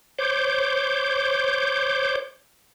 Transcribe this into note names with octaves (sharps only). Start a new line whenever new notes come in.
C5 C#5 D6 G6